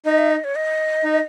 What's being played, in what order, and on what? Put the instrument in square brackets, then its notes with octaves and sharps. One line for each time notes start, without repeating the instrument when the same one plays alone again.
[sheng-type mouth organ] D#4 [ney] D#5
[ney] E5
D#5
C#5
D#5
[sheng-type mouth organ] D#4